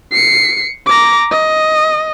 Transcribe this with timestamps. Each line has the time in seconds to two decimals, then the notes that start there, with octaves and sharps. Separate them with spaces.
0.12 C7 C#7
0.87 A#5 D6
1.31 D#5